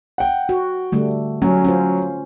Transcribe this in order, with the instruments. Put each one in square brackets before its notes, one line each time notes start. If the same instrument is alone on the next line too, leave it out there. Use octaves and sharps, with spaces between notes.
[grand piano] F#5 G5
[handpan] F#4
D3 G3 A3
[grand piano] F#3 [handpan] C#4
[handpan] C#4 F4 C5